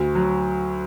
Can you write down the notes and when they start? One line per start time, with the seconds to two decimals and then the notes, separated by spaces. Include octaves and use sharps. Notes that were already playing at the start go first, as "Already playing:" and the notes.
Already playing: D2 F#4
0.15 F#3